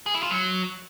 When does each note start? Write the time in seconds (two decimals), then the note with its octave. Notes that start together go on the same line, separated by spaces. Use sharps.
0.06 G#4
0.14 E4
0.23 F4
0.31 F#3